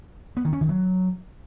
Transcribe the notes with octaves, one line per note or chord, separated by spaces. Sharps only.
B3
D#3
C#4
D#3
F#3